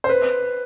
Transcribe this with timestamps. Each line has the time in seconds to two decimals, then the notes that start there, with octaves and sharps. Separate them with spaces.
0.04 C5
0.09 B4